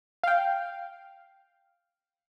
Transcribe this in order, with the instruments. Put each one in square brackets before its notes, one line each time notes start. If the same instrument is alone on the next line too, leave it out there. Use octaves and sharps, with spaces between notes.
[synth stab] F5 G5